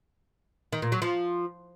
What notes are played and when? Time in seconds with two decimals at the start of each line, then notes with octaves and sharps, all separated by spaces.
0.73 D#3
0.82 A#2
0.92 F#3
1.02 F3